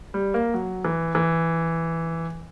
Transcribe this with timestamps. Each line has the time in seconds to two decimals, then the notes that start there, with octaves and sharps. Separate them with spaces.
0.14 G3
0.34 A#3
0.54 F#3
0.85 E3
1.15 E3